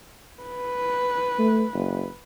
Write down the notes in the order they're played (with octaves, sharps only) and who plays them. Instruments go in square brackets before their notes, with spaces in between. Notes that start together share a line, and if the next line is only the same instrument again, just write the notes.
[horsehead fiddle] B4
[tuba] A3
F#1